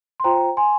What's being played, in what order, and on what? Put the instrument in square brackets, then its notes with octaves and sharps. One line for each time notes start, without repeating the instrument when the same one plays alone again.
[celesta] C6
F4 C5 G5 A#5
G#5 C6